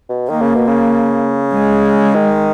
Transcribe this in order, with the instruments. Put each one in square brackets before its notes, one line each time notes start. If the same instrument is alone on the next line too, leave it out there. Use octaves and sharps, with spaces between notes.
[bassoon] B2
[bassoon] D#3 [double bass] A#3
[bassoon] C#3
B2
C#3
[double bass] G#3
[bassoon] D#3